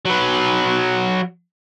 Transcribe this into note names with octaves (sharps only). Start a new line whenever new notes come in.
F#3 B4